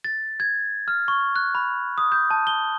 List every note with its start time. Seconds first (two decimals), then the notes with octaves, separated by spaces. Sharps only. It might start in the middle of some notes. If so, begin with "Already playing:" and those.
0.04 A6
0.40 G#6
0.88 F6
1.08 C#6
1.36 F#6
1.55 B5
1.98 D#6
2.12 G6
2.31 A5
2.47 G7